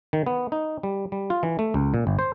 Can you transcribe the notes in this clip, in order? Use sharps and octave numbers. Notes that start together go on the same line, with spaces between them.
D#3
B3
D#4
G3
G3
F4
E3
A3
C#2
A#2
G1
C5